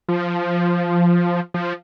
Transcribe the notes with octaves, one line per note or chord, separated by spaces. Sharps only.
F3
F3